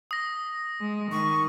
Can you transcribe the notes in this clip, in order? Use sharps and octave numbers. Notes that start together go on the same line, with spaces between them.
D#6 A#6
G#3
D#3 C#6